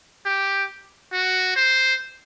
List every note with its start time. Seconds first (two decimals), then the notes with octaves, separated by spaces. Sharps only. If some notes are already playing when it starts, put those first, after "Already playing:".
0.26 G4
1.13 F#4
1.56 C5